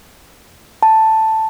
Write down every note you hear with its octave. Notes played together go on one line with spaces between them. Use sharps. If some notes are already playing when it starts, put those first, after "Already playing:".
A5